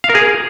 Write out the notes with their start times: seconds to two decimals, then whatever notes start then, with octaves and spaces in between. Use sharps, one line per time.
0.04 F5
0.10 A#4
0.15 G#4